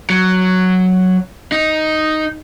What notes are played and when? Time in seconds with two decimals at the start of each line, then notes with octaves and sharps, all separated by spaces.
0.10 F#3
1.52 D#4